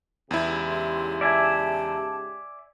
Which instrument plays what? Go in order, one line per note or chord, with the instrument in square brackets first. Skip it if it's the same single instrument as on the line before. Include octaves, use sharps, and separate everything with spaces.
[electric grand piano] E2 E4 [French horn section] G#2 C#3 G4
[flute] C6
[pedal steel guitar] D5 E5 G#5 [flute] A5